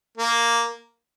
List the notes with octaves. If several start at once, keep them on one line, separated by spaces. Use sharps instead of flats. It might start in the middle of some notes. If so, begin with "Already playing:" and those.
A#3